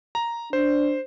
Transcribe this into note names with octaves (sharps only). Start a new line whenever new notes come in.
A#5
D4 C5